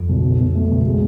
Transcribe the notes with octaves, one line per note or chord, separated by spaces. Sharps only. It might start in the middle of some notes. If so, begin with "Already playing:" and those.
Already playing: F2
B1
B2
B2
A3
B1
G#3